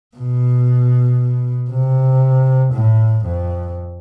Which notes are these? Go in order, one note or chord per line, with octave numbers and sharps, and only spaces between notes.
B2
C3
A2
F2